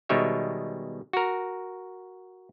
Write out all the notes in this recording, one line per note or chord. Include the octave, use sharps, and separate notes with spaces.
B2 D#3 G3 G#3 C#5 E5
F#4 A#4